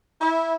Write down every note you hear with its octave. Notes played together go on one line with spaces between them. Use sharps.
E4